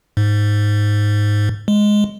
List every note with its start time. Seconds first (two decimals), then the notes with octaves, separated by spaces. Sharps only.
0.17 G#2
1.68 G#3